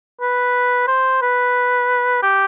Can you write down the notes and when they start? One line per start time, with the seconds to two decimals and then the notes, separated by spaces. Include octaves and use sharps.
0.21 B4
0.88 C5
1.22 B4
2.23 G4